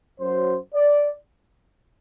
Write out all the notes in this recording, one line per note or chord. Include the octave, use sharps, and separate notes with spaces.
F#2 F#3 C5
D5